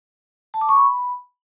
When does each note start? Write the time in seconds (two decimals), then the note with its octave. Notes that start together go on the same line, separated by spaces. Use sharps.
0.54 A5
0.61 D6
0.69 C#6
0.76 B5